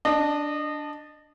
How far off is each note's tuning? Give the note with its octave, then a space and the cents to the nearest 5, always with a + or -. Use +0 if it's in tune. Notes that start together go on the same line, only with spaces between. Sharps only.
D4 +0 D#5 -25